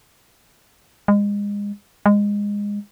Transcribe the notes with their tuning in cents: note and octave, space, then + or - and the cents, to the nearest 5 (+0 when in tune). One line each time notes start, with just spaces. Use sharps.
G#3 -30
G#3 -20